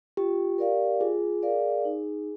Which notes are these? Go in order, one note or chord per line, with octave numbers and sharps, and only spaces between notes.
F4 G4
A#4 D5 F5
F4 G#4
A#4 D5 F5
D#4